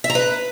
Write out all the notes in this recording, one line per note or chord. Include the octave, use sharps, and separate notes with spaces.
E5
A#5
B4